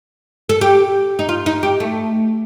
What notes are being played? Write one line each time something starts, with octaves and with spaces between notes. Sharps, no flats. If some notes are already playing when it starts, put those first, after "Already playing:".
A4
G4
D#4
F4
D#4
G4
A3